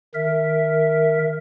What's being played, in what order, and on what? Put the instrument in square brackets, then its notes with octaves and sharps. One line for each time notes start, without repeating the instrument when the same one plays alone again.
[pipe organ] D#3 A#4 E5